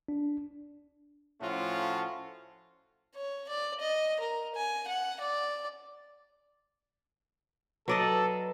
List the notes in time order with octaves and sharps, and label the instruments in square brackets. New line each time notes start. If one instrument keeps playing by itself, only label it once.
[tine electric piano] D4
[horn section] A2 F3 A3 C#4 F4 F#4
[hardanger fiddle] C#5
D5
D#5
A#4
G#5
F#5
D5
[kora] F#3 D5 D#5 [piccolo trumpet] A4 [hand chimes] B4